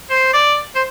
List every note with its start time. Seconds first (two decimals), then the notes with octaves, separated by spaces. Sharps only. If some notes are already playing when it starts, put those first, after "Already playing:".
0.10 C5
0.34 D5
0.75 C5